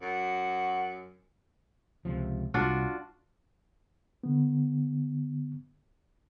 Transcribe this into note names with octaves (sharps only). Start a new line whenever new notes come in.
F#2 F#4
C#2 C3 F3
C2 D4 F4 F#4
D3 B3